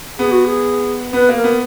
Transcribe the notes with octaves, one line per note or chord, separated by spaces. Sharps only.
B3 G#4
F#4
G#4
B3 B4
A#3
A#4
B3